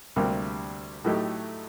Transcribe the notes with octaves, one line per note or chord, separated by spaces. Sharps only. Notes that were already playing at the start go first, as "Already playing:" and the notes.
D2 C3 G3 A#3
A2 F#3 A3 D#4 G4